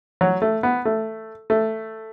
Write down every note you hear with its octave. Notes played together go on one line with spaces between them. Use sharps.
F#3
A3
B3
A3
A3